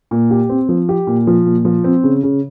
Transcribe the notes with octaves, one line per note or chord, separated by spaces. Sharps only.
A#2
G4
C4
F3
G4
A#2
F3
A#2
F3
C4
C#3
C#3